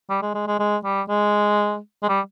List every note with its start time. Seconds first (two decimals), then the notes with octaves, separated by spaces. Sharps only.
0.10 G3
0.22 G#3
0.35 G#3
0.47 G#3
0.60 G#3
0.85 G3
1.09 G#3
2.03 G#3
2.09 G3